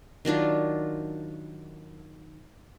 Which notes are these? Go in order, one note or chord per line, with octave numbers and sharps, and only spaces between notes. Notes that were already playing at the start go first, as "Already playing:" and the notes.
D#3 F#3 D4 F4